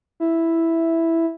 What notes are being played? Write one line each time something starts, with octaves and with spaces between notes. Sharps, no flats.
E4